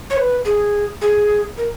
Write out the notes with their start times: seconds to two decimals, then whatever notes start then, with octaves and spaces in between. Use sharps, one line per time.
0.10 C#5
0.17 B4
0.45 G#4
1.01 G#4
1.58 A#4